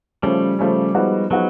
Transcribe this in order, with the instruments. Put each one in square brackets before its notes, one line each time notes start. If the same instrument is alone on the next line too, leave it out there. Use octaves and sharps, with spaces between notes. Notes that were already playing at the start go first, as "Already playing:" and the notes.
[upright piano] C#3 F3 A3 C#4 [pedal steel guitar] G3
[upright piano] C#3 F3 A3 C#4
F3 G#3 B3 D#4 F#4
[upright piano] F3 G#3 B3 D#4 F#4 [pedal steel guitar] F#3